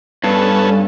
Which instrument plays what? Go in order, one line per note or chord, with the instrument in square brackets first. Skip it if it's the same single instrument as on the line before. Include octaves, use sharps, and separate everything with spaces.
[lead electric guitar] G2 [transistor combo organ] B3 C#4 A4